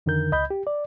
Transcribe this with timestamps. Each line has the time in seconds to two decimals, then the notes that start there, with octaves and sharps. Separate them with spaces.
0.06 F2 D3 D#3 A#4 G6
0.32 C#2 D#5 B5 G6
0.51 G4
0.67 D5